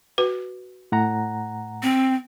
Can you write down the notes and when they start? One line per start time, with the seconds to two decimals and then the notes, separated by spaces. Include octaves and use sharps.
0.18 F#4 B4
0.92 A2 F#5 A#5
1.83 C4